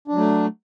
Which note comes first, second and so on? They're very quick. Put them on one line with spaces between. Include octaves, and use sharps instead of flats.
D4 F#3 A3